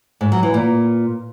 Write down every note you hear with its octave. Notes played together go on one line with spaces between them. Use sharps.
G#2
F#3
E3
A#2